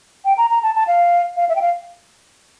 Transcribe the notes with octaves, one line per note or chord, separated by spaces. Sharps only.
G5
A#5
A#5
A5
A5
F5
F5
E5
G5
F5